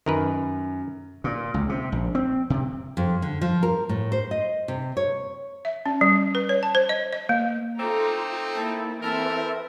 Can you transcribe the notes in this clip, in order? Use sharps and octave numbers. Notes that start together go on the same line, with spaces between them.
F#2 D#3 A#4 B4
A#2
C#2
C3
A#1
C4
C3
F2
D3
F3
A#4
A2
C5
D#5
C3
C#5
E5
C#4
G3
B4
C#5
A5
C5
D#5
D#5
A#3
A3 C4 D#4 F4 A4 A#5 D6
A#3 E4 A4
E3 C4 A4 A#4 E5